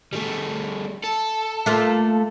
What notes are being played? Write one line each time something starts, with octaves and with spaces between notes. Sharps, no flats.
G3 A3
A4
A3 A#3 F4